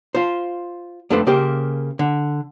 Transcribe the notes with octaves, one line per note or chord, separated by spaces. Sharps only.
F4 C5
F2 A3 D4 A4 B4 C5
C#3 A#3 G4 C5
D3